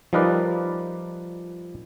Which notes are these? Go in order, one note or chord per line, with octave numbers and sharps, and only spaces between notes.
F3 G3 D#4 A#4 B4 D5